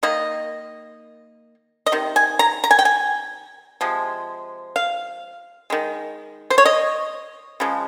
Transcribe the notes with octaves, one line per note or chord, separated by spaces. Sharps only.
D#3 A#3 D#5
D#5
C3 D#3
G#5
A#5
A#5
G#5
G5
G#5
C3 F3 G#3
F5
D#3 G#3
C5
C#5
D#5
C#3 F3 G#3